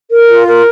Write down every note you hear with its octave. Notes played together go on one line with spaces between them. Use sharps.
A#4
F4
A#4